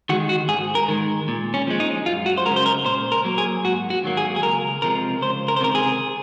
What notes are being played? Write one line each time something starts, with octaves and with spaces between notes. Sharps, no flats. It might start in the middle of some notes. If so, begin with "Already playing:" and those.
D#3 G#3 F#4
F#4
G#2 G#4
A#4
D#3 G#3
A#2
C#4
F3 G#3
D#4
F#2 F4
F#4
C5
C#3 G#3 A#4
C5
A#4
A#2 C5
A#4
F#3 A#3
G#4
G#2 F#4
F#4
D#3 F#3 A#3
G#4
G#4
C#2 A#4
C3 F3 G#3 A#4
C#2 C5
A#4
C5
C3 D#3 A#4
G#4